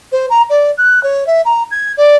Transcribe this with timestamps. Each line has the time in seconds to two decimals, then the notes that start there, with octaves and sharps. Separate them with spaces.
0.12 C5
0.29 A#5
0.49 D5
0.78 F#6
1.03 C#5
1.26 E5
1.45 A#5
1.71 G#6
1.97 D5